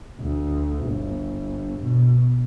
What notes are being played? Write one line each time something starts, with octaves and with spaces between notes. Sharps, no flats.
D2
G1
B2